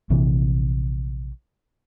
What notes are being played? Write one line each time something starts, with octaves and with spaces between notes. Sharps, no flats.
A#1 C3 E3